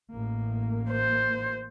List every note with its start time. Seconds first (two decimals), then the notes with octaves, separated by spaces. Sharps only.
0.12 A1 A#3
0.91 C5